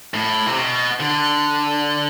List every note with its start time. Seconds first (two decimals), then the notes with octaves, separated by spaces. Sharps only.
0.14 A2
0.46 C3
0.58 B2
1.00 D3